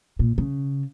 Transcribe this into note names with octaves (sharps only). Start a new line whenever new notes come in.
A#2
C#3